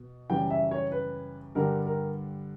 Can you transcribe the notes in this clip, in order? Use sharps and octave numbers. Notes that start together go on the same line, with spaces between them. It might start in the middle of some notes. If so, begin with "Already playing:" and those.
Already playing: B2
F#2 C#3 E3 G3 G5
E5
C#5
B4
G2 D3 G3 A#4
A#4